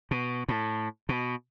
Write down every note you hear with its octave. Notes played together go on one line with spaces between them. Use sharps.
B2
A2
B2